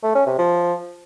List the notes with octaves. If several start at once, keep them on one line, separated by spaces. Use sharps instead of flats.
A3
C#4
C3
F3